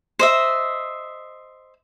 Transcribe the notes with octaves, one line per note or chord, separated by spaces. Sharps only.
C5 D#5 E5